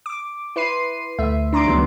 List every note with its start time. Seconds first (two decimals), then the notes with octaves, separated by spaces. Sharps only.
0.06 D6
0.56 E4 B4 C6 C7 D#7
1.19 D2 A3 E5
1.53 D4 A#5 C6 D6 D7
1.65 C#2 D#3 F#3 G3 B3